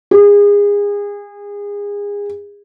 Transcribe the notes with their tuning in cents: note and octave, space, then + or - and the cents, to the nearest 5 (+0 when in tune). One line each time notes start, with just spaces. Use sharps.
G#4 -30